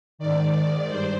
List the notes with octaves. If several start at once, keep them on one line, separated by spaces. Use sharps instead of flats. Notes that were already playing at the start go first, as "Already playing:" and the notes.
G#2 D#3 D5
G2 C5